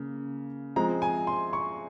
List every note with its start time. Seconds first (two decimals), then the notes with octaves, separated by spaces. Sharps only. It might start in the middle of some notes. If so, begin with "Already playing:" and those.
Already playing: C#3 A#3
0.76 F3 G#3 C4 A#5
1.02 G#5
1.27 C6
1.53 C#6